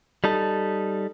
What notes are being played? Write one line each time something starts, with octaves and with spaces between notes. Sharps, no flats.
G3 D#4 A4